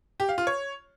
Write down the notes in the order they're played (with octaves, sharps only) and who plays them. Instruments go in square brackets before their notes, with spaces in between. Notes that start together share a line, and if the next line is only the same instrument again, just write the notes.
[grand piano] G4
F5
F4
C#5